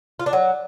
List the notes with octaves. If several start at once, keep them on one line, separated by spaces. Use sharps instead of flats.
F4
D4
F#3